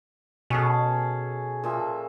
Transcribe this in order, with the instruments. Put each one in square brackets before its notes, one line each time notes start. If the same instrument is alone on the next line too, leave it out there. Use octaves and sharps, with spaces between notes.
[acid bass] B2 [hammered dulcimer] C#4 G#4 A4
[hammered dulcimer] A#2 F3 E5